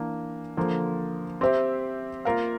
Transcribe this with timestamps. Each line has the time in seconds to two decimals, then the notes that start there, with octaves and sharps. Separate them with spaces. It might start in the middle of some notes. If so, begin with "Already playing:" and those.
Already playing: E3 A#3 D4
0.57 D3 F3 A#3
1.41 C4 G4 C5 E5
2.25 A#3 F4 A#4 F5